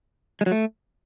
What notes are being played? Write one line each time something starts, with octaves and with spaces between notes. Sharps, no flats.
G#3
F#3
A3